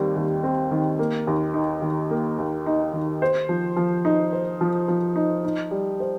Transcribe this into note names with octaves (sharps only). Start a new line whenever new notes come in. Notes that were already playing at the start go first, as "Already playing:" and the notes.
Already playing: D#2 D#3 G3 C4
D#2
C4
D#3
A#3
D#2
D#4
D#3
A#3
D#2
D#4
D#3
C5
F3
F3
D#4
C5
F3
F3
D#4
D#4
G3
C5